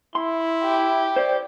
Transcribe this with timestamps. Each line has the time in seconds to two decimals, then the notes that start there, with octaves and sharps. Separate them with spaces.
0.15 E4 C6
0.63 G4
1.16 C5 D5